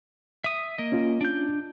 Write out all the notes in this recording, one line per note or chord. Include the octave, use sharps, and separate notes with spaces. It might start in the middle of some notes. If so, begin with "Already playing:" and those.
E5 D#6
A#3 D#5
C#4 F4
D4 G6